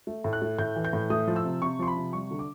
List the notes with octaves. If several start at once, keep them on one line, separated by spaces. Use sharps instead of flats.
A3
A2
F#6
A3
A2 G6
E3
G6
A2
A3 D#6
F3
E6
C3
C3 C#6
F3 C6
B5
C3
G3 C#6
D3
D6